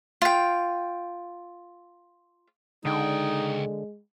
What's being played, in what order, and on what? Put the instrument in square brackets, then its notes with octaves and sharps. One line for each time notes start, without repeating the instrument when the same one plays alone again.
[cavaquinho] F4 G5
[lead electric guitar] C#2 G5 [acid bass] D3 [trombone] G#3 [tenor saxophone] D#4